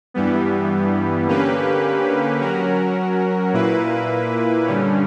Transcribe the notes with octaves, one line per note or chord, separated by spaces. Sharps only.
G2 E3 G3 B3
D3 A#3 C#4 G4 B4
F#3 C#4 F#4 A#4
A#2 A#3 E4 B4
G2 D3 G3 C#4